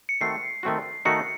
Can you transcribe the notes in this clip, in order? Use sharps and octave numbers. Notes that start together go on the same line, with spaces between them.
C#7
D#3 A3 C4 F#4 C7
D#3 A3 C4 F#4
D#3 A3 D#4 F#4 C#7